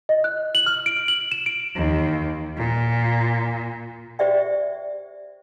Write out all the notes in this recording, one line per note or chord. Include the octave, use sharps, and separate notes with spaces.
D#5
F#6
F#7
F6
D7
F#7
E7
D7
D#2
A#2
G4 C5 D5 E5 G5